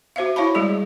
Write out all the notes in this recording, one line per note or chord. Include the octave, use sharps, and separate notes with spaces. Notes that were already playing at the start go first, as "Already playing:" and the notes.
F#4 C5 E5 F5
E4 C#5 F5 A5 B5
G3 G#3 G#4 D5